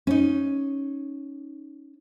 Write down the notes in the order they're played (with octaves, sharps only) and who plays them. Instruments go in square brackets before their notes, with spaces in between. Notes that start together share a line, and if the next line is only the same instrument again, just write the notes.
[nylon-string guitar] C#4 D#4